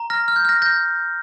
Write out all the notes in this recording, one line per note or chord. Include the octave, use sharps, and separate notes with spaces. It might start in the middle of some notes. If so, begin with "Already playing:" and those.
Already playing: A#5
F6 A#6
F6
G6
F6 A#6
G6 A#6